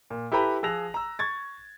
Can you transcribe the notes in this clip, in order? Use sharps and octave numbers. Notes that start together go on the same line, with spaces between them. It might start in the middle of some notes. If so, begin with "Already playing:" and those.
A#2
E4 G4 A4 B4 A#5 B5
F3 G#4 E6 F#6 A#6 F7
A#5 E6
C#6 G#6 A6